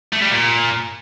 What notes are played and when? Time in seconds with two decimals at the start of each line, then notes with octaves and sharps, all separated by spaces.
0.12 A3
0.22 G3
0.31 A#2